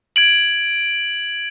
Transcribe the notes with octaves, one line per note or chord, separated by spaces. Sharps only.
G#6 D7 F#7